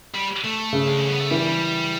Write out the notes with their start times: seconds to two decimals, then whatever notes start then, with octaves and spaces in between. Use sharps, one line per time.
0.14 G3
0.44 A3
0.73 C#3
0.86 D4
0.97 C#4
1.08 B3
1.20 A3
1.30 E3 G3